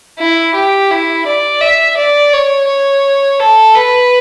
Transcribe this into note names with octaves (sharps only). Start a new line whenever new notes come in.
E4
G4
E4
D5
E5
D5
C#5
C#5
A4
B4